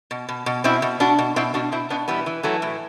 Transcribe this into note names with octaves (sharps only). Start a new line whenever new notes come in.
B2
B2
B2
B2 C4 E4
B2
B2 D4 F#4
B2
B2 C4 E4
B2 D4 F#4
B2 C4 E4
B2 B3 D4
E3 G3 B3
E3
E3 F#3 A3
A2